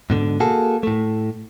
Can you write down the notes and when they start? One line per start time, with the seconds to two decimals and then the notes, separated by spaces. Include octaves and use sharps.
0.10 G#2 B2 D3
0.40 A#3 F#4 G#4 A4
0.83 A2 A3